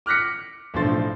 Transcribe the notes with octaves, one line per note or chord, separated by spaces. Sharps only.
D6 F6 F#6 A#6 B6 C#7
B1 A2 D3 F3 C6 A6